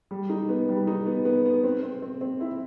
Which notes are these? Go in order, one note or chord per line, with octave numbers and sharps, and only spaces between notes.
G3
D#4
B3
G3
D#4
B3
B3
B3
C4
C4
C4
C4
E4